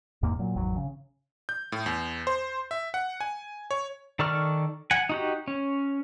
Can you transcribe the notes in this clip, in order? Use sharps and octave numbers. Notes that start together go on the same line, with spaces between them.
E2 G#2 C3 A#3
A#2 F#3
G#1 E2 F#3
C#3
G6
A2
E2
C5
E5
F#5
G#5
C#5
D#3 A4 D5 C#6 F6
F#5 G#5
D#4 F#4 G4
C#4